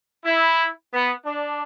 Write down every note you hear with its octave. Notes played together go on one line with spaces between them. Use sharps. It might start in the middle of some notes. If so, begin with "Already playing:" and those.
E4
B3
D4